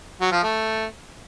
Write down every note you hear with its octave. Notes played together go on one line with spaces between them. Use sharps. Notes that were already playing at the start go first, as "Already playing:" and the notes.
F#3
F3
A3